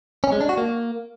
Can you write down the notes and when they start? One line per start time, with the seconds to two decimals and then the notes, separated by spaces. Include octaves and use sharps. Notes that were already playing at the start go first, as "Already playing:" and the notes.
0.24 C#4
0.32 G#3
0.41 D4
0.49 F#4
0.58 A#3